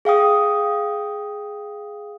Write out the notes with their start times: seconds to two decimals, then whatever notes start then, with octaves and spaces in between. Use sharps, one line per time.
0.05 G#4 F5 G5 D#6